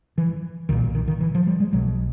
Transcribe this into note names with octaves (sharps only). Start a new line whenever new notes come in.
E3
B1 A#2 D#3
D#3
D#3
E3
F3
G3
G#3
B1 B2 F#3